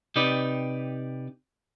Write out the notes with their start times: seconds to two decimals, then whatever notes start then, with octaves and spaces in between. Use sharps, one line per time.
0.16 C3 D#4 G4 B4 D5